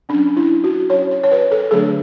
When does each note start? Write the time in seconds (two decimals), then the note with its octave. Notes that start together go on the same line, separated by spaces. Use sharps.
0.09 F#3 C#4 D4
0.37 E4
0.64 F#4
0.90 F#3 C#4 C#5
1.11 C#5
1.23 C#5
1.32 B4
1.52 A4
1.71 D3 F#3 A3 D4 G#4